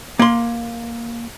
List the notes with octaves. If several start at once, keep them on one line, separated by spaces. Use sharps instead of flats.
A#3 C6